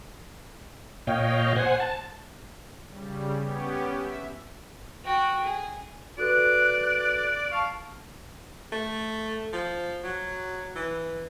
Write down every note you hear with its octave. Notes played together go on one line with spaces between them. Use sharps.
A#2 C#5 D#5 F5 G5
C5 F#5 G#5
A5
C#3 G3
B3 C#4 G4
E5
F#4 G5
G#4
F#4 A4 B4 D5 F#6
F5 A5 C#6
A3
F3
F#3
E3